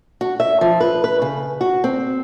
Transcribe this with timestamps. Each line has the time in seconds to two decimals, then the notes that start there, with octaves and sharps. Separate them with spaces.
0.21 F#4
0.40 E5
0.61 F3
0.80 B4
1.04 B4
1.22 C#3
1.61 F#4
1.84 C4